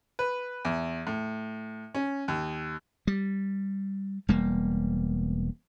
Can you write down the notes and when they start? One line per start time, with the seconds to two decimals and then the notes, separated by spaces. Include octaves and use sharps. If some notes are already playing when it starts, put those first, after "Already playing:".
0.19 B4
0.65 E2
1.07 A2
1.94 C#4
2.28 D#2
3.07 G3
4.29 E1 G3 A#3